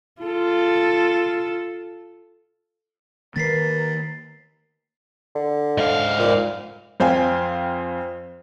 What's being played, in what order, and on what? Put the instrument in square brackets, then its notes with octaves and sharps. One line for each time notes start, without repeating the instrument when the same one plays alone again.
[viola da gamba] F4 A4
[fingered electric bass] D#3 A#3 [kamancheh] A#4 B4 [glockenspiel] A6 B6 C7
[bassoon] D3
[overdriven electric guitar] G#2 F5
[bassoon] A#2
[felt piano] F2 C5 F5 G5 G#5